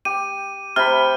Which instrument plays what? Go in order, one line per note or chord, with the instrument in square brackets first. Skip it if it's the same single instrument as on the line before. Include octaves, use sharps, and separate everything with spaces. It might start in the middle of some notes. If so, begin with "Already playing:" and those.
[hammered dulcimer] G4 [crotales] D#7
[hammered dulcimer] C3 B5 [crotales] F6